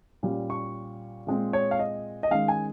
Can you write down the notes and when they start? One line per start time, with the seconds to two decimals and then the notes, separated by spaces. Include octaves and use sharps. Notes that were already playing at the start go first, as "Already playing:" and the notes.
0.23 A#2 G3 C#4
0.50 C#6
1.27 A#2 G#3 C4
1.53 C#5
1.71 F5
1.79 D#5
2.23 D#5
2.31 D#3 G#3 C#4 F5
2.48 G#5